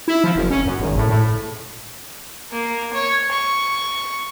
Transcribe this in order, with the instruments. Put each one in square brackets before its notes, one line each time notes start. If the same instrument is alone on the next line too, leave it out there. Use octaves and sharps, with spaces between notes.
[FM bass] E4
F3
F#1
C#4
F#2
G#1
A2
A2
[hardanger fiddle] A#3
C#5
C#6